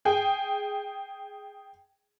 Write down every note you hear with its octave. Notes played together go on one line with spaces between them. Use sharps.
G#4 G5